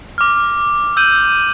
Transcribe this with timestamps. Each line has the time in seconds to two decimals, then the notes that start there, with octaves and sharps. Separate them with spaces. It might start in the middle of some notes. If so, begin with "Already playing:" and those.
0.18 D6 F6
0.97 E6 G6 D#7 F#7